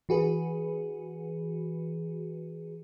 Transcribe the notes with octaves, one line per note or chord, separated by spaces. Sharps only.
E3 F#4 G#4 B4